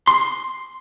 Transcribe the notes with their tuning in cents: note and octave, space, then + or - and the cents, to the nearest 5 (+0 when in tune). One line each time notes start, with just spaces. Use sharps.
C6 +0